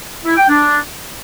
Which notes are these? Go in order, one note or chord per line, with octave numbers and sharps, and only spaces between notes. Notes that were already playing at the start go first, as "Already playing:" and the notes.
E4
G5
D4